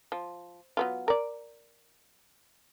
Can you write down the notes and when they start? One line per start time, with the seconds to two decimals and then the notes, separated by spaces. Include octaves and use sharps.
0.12 F3
0.77 F#3 B3 F4
1.08 A#4 D5